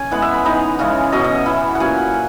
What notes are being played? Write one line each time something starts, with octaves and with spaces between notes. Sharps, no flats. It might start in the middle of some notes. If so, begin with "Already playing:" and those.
Already playing: C#4 G#5
E3 G#3 B3 F#5
E5
B5
E3 B3 D#4 A#5
C#3 E3 G#3 C#4
B2 F#3 C#4 D#5
D#5
E5
E3 B3 E4 B5
F#5
A#2 F#3 C#4 G#5